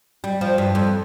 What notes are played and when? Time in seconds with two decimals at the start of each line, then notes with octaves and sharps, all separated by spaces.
0.24 G3
0.41 F3
0.58 G2
0.75 F2